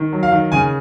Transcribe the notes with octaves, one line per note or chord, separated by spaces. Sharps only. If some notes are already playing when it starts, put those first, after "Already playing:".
Already playing: D#3
F#3
F5
D#3
C#3 G#5